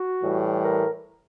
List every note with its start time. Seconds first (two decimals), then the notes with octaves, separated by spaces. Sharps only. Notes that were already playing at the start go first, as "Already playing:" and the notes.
Already playing: F#4
0.21 A2 E3 G3
0.61 A#4